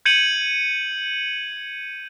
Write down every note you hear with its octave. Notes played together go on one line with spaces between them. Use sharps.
G6 G#6 C#7 D#7 F#7